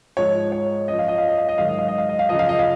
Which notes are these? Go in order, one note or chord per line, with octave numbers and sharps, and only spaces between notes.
G#2 F3 C#5
C#5
F#2 F3 D#5
F5
D#5
F5
D#5
F5
D#5
G#2 D#3 F#3 F5
D#5
F5
D#5
F5
D#5
F5
F#2 C#3 F3 D#5
F5
D#5
F5